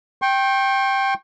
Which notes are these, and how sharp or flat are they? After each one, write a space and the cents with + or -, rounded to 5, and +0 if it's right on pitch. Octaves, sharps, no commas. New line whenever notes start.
G5 +0 C#6 -45